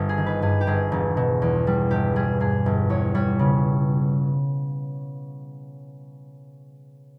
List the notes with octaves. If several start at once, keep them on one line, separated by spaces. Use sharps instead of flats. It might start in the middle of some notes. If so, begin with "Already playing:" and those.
Already playing: G1 G3
G#4
D#3
B4
G2 G#4
G4
G1 G#4
E1
B2
E2
G3
G1 G4
G3 G#4
G2 G#4
G1
E2 C#5
G3 C#5
C#3